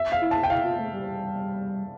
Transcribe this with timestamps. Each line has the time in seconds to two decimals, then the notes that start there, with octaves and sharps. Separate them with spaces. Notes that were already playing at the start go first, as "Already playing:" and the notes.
Already playing: E5
0.12 F5
0.21 E4
0.31 A5
0.43 G5
0.50 E4 F5
0.64 F4
0.79 A3
0.93 G3